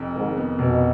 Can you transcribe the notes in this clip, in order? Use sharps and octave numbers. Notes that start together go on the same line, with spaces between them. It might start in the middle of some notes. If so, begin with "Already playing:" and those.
Already playing: F1 F2
G#2 D#3
B3
F1 B2